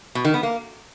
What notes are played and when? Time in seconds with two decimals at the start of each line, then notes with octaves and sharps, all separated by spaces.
0.15 B2
0.25 D#3
0.34 B3
0.43 A#3